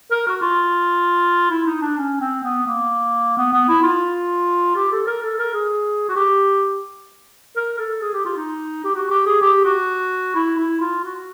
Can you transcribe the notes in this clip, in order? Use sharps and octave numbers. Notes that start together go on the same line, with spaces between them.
A#4
F#4
F4
E4
D#4
D4
C#4
C4
B3
A#3
B3
B3
E4
F4
G4
A4
A#4
A4
A#4
G#4
F#4
G4
A#4
A4
G#4
G4
F4
D#4
G4
F#4
G4
G#4
G4
F#4
E4
E4
F4
F#4